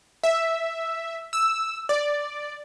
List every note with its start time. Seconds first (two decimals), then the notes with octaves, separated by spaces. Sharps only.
0.24 E5
1.33 E6
1.89 D5